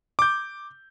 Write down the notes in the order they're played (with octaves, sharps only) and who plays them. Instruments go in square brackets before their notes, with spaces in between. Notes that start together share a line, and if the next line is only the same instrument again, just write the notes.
[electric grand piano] D6 G6